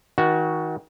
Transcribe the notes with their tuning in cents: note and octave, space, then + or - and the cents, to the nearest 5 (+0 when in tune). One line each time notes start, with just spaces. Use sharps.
D#3 +35 F#4 +0